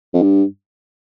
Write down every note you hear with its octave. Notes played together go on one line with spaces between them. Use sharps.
F2
G2